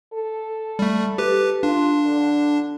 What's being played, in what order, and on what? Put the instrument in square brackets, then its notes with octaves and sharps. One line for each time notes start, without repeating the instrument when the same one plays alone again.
[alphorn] A4
[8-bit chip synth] G3 A3
G4 B4
[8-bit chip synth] D4 [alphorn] F4
[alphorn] D3